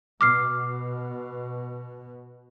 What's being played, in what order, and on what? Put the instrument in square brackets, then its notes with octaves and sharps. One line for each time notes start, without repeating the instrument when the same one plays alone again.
[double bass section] B2 [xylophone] D6 F6 C7